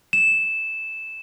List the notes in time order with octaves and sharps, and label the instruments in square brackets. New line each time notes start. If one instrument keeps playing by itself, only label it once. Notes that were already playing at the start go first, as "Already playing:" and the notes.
[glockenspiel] E7